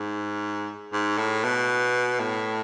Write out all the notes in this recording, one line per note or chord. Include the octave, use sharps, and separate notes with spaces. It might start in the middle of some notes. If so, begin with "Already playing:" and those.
Already playing: G#2
G#2
A2
B2
A2